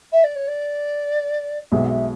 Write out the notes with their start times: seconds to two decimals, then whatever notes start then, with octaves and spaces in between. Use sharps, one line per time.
0.12 E5
0.23 D5
0.35 C#5
0.47 D5
1.71 B1 B2 G#3 E5
1.84 F#5
1.89 E5